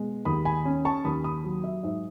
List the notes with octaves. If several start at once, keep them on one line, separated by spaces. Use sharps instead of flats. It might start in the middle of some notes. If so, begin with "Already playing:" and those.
Already playing: B2 G#3
D#2 B5 D#6
G#5 B5
C#4
A5 C#6
D#2 B5 D#6
B5 D#6
F#3
E5
G#2 E5